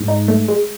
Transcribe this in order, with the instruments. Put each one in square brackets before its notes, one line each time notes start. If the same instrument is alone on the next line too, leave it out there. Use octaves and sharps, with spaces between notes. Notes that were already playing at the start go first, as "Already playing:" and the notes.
Already playing: [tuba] G#2
[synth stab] D#4
A3
G#3